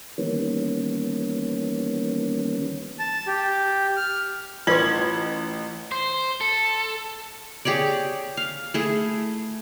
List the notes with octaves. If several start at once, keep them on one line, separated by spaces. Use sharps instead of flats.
D#3 E3 G3 A#3 B3 C#4
A5
G4
F6
A1 F4 B4 C6 G#6 F#7
C5
A4
G4 G#4 C#5 D5
F5
A3 E4 G#4